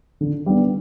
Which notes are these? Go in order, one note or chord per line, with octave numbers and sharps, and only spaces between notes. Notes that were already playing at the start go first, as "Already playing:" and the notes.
D3
G3 B3 D4